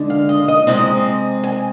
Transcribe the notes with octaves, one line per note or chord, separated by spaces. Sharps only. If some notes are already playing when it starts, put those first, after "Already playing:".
Already playing: D3 G#3 D4
F5
D#5
D#5
C3 F3 G#3 C4 D#5
G#5